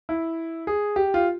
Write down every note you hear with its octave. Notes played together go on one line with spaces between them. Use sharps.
E4
G#4
G4
F4